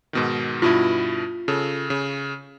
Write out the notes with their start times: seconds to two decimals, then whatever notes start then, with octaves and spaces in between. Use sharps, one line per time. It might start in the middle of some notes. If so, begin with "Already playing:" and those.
0.13 G#2 B2 D#3
0.62 G2 B2 E4 F4
1.48 C#3 A4
1.90 C#3